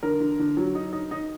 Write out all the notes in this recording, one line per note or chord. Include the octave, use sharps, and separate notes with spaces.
D3 A#4
D3
D3
F#3
D#4
D#4
D#4